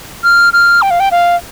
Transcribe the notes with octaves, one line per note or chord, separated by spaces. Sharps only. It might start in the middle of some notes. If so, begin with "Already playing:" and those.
F6
F6
G5
F5
G5
F5